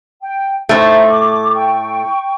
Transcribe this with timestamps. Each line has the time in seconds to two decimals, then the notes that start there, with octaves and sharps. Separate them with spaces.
0.22 G5
0.69 A2 A3 D#4 C5
1.09 D6
1.54 G5 C#6